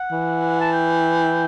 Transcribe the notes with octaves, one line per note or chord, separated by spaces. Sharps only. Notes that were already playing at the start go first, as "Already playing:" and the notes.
Already playing: F#5
E3
A5
G5